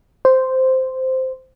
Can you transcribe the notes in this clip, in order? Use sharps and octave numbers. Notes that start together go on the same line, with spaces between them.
C5